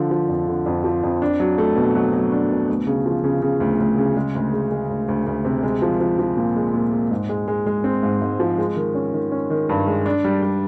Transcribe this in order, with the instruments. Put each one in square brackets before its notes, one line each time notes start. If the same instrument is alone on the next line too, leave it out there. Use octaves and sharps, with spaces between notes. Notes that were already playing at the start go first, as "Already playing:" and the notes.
Already playing: [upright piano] D3 F3
F3
F2
D3
F2
F3
F2
D4
F#3
A3
B2
F#3
F#3
D4
B2
D2
C#3
F3
C#3
C#3
D2
D2
C#3
G#3
D2
G#3
G#3
D2
D2
D2
C3
G#3
F3
F3
F3
A#2
G#3
A#2
G#3
G#2
G#3
G#3
G#3
C4
G#2
G#2
F3
G#3
D#3
C#4
D#3
C#4
D#3
G2
G#3
D4
G3
G3